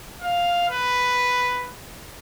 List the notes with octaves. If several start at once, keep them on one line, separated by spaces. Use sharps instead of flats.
F5
B4